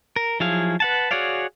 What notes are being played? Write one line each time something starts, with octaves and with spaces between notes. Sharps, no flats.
A#4
F3 F#3 E4 G#4 F5
B4 F#5 A5
F#4 G#4 C#5 D5 F5